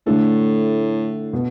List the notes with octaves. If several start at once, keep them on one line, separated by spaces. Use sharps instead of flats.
A2 D3 A3 D4 A4
B2 B3